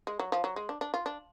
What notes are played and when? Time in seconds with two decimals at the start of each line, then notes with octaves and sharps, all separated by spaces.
0.07 G#3
0.19 F#3
0.32 F3
0.44 F#3
0.56 G#3
0.69 D4
0.81 D4
0.94 F4
1.06 D4